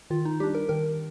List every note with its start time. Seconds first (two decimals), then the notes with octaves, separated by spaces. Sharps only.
0.10 D#3 F4
0.25 D#4
0.40 G3 D4 G4
0.55 A#4
0.69 D#3 A#4